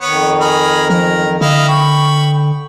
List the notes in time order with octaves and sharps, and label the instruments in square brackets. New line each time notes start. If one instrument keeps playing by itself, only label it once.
[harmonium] F2 D#3 [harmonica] B3 C#5
[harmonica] G#4 A#4 B5
[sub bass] F3 [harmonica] A#4
[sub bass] D3 [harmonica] E4 D#5 F5
[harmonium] G5 [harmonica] B5 C#6